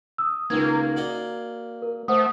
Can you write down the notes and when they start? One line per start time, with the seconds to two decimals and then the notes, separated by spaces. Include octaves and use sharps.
0.18 D#6 E6
0.50 C#2 D#3 A#3 G#6
0.96 F#4 D5 D#5
1.82 A#4
2.08 A3 C5 F#5 D#6